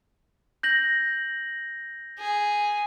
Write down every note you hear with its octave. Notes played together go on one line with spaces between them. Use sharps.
G6 A#6 F#7
G#4